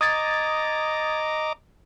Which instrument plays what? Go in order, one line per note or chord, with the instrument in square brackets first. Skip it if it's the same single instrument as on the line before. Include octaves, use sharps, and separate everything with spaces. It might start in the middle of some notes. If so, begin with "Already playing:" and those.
[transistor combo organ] D#5 A#5 D6 [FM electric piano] D#6 G#6 A6